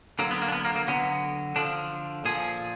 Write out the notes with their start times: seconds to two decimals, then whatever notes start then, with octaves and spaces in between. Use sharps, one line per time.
0.19 D3 F#3 A#3
0.31 B3
0.42 A#3
0.48 D4
0.52 B3
0.65 A#3
0.76 A#3
0.88 D3 F#3 B3
1.56 D3 F3 D4
2.25 A#2 F3 G#4